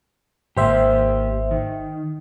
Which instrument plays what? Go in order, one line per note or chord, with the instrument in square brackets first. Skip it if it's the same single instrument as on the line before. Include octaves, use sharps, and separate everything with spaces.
[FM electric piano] G#1 C5 E5 [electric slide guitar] A#3 G4
[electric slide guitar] D#3